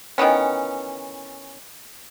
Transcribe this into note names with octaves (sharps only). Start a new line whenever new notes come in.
D#3 E3 B3 C#4